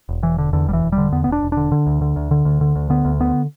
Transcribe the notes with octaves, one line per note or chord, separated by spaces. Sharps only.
E1
E1 E3
D3
E2 D3
E1 G3
E3
E1
G3
D3
E2 B3
E1 B3
D4
E1
D3 D4
D3
D2
D3
D2
D3
D2
D3
D2
D3 B3
D2
D3 B3